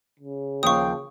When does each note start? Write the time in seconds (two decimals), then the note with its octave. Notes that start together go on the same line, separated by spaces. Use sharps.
0.19 C#3
0.63 D#2 F3 F5 G5 C#6 D#6